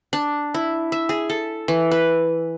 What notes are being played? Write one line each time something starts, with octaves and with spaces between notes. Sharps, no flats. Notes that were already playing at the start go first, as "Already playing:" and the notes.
D4
E4
E5
G#4
A4
E3
B4